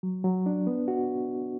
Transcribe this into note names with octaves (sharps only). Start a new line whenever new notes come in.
F#3
F#3
D4
B3
F#4